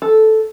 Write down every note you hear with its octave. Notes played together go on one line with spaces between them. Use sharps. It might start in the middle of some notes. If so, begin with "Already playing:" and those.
A4